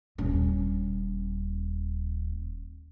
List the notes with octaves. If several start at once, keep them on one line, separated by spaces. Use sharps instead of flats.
D#1 C#4